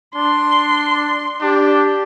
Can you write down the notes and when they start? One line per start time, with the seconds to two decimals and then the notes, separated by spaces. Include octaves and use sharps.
0.16 D4 C6
1.41 D4 G4